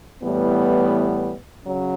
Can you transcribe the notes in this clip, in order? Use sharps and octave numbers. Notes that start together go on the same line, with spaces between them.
A2 E3 G3 B3
C#3 F#3